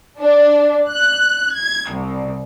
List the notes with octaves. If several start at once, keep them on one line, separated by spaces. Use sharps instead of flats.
D4
F#6
G#6
C2